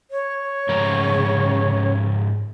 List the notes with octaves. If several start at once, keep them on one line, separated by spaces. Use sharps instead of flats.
C#5
G#2 C#3 F3 A#4